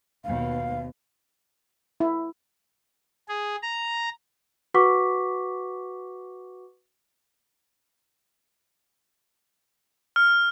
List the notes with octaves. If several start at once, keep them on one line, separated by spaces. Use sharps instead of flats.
D#2 B2 F5
E4
G#4
A#5
F#4 B4 F#5 C#6 D6 B6
F6